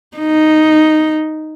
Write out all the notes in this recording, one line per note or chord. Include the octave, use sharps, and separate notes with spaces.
D#4